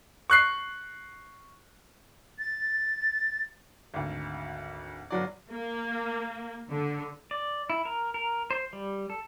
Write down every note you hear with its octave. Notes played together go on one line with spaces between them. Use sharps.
C#6 F#6 C7
A6
G#1 D2
G1 F#3 D5
A#3
D3
D5
E4
A#4
A#4
C5
G3
A4